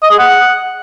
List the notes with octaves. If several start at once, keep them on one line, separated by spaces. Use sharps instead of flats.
D#5
G#4
F#5